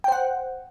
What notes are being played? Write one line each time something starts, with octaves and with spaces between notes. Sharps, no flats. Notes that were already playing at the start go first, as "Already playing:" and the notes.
C5 F#5 G5